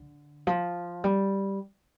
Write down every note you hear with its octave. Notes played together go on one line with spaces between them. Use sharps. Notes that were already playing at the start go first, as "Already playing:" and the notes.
Already playing: D3
F3
G3